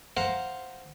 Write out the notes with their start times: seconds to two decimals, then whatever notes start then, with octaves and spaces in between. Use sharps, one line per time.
0.17 C5 F5 F#5 A#5